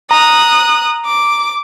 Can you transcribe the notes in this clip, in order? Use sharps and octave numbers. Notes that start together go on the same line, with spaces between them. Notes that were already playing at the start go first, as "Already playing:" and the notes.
A#5 D#6 F#6
D6